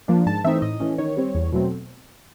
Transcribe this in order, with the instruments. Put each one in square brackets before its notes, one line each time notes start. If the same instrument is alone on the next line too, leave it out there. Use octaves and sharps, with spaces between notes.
[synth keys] F3 A#3 D4
G#2 A5
E3 A3 C4 D#4 E5
A2 D#5
E3 A3 C#4
D#3 C#5
G3 C4
E2
B2 F#3 A3 C4